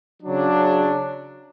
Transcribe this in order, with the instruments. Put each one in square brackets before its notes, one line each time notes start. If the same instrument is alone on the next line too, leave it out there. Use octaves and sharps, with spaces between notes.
[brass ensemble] C#3 F#3 D4